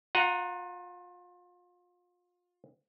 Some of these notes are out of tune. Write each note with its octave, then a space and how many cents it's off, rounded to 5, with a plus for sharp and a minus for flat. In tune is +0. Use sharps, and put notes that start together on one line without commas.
F4 +30 F#5 +0 A#5 +0